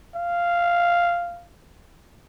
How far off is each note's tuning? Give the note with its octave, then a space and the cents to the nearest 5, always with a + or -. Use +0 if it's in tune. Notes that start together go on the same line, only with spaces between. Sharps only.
F5 -5